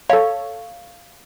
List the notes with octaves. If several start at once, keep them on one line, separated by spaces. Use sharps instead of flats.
A4 C#5 F5